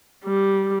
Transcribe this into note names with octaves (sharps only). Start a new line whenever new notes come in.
G3